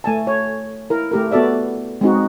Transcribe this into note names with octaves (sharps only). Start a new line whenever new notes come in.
A3 G#5 A5
C#5
E4 A#4
A3 G4 A#4
B3 F#4 A4 D5 E5
G#3 C4 D#4 F#4